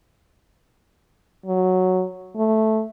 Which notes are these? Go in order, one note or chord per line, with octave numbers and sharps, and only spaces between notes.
F#3
A3